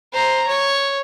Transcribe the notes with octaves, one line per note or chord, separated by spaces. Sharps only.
C5 A#5
C#5